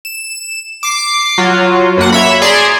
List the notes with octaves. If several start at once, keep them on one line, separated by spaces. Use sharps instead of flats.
E7
D6 C7
F#3 F4 F#4
F#2 A#3 F#5
C#5 E5 B5
G#4 D5 A#5 C6